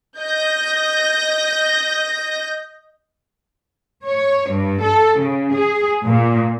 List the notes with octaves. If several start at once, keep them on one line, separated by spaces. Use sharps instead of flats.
D#5 G6 A#6
C#5
G2
A4
C#3
G#4
A#2